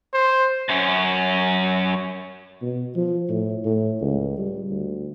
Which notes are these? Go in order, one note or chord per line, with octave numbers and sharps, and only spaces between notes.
C5
F#2 C#4
B2
F3
A2
A2
C#2
G3
D2